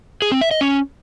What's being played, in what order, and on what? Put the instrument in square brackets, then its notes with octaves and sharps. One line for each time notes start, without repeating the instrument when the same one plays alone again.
[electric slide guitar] G#4
C4
E5
D#5
C#4